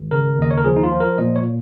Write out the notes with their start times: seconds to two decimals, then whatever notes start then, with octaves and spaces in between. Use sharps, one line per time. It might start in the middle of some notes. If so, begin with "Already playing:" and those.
Already playing: G#1
0.11 C#3 A#4
0.38 D#2 D#5
0.51 C#5
0.58 A#4
0.64 F3 G#4
0.76 D#4
0.83 F4
0.92 F3
1.00 A#4
1.18 A#2 D#5
1.36 C#5